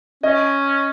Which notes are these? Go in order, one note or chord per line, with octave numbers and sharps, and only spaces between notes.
C#4 D#5